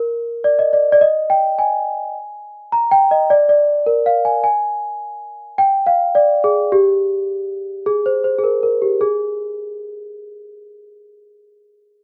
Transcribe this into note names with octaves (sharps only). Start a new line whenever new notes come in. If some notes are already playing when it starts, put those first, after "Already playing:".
Already playing: A#4
D5
D#5
D5
D5
D#5
G5
G#5
A#5
G5
D#5
D5
D5
A#4
F5
G#5
G#5
G5
F5
D5
G#4
G4
G#4
C5
C5
G#4
A#4
A#4
G4
G#4